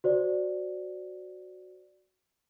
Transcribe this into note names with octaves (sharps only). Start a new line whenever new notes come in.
F#4 C5 D5